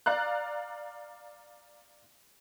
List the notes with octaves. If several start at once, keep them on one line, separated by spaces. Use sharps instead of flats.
D5 F5 A#5 F#6